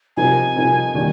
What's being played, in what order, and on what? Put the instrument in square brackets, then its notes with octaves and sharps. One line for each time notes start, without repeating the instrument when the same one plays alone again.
[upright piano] C3 F3 C4 D#4 A#4 [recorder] G#5
[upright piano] C3 F3 C4 D#4 A#4
D#3 G3 A#3 D4